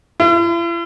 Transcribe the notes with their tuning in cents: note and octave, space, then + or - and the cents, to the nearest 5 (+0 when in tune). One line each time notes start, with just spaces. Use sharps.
E4 +45